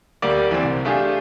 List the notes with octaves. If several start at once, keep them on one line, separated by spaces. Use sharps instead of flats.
D2 G3 A#3 G4 D5
E3 G3 C4
C2
A3 D4 F4 G4 G#4